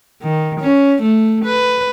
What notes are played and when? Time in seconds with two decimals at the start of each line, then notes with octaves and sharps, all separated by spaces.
0.22 D#3
0.61 C#4
1.03 A3
1.45 B4